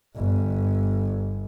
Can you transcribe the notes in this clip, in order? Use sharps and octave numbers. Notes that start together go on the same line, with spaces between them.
G1